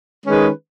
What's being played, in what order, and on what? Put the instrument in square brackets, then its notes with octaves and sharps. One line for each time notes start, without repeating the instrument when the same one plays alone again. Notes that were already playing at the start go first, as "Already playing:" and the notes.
[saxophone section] D#3 G#3 C#4 G#4 B4